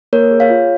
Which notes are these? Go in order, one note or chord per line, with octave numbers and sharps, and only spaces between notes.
A#3 A#4 C#5
G#4
C#5 F5
F4